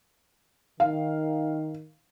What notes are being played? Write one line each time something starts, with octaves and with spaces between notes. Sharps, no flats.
D#3 F5